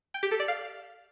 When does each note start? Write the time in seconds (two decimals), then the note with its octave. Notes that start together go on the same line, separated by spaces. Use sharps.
0.14 G5
0.23 G4
0.31 A4
0.40 D5
0.48 F5